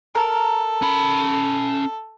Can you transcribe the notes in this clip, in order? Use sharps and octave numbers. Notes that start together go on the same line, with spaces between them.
A4 A#4
C#4 B5